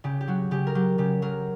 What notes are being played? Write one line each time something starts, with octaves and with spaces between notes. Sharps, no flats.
C#3 G4
G4
F#3 F#4
C#3 G4
A#4
F#3 G4
C#3 G4
F#3 A#4